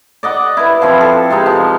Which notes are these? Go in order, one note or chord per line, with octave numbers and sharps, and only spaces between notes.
D5 D#5 F#5 B5
E4 B4
F3 C4 E4
A4
C3 G#3 D#4 B5
F3